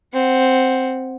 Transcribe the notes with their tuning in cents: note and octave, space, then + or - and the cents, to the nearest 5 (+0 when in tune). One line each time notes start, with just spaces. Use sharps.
C4 +0 F#5 +0